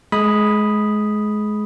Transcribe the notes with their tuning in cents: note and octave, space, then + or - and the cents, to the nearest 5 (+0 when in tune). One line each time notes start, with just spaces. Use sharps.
G#3 +25 B5 -5 D#6 +0